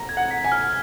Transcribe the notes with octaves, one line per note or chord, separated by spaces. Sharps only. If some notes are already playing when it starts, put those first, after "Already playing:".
Already playing: A#5
G#6
F#5
B6
G#5
F6